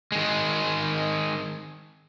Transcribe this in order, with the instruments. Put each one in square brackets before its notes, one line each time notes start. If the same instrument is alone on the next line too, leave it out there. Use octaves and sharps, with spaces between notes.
[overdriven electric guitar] D#3 G#3